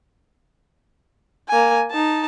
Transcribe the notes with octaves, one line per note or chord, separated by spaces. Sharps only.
A#3 G#5
D#4 A5